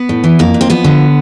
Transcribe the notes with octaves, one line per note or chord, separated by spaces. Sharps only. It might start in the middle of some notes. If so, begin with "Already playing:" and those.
Already playing: B3
A2
E3
F2 A#3
F2
C4
F3 B3
D3